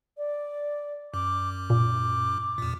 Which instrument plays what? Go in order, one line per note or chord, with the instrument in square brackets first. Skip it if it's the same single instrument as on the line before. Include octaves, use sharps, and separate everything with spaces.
[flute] D5
[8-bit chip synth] F#2 [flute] D6
[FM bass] A#2 [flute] D6
[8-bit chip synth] E2 A#2